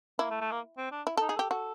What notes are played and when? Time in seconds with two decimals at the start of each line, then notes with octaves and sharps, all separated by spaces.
0.19 A#3 E4
0.30 A3
0.41 A3
0.52 A#3
0.77 C4
0.92 D4
1.07 E4
1.17 D#4 A4
1.29 G#4
1.36 G4 A4
1.50 F#4 A4